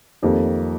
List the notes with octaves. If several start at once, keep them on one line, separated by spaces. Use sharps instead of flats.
F2 D#3 G3 A#3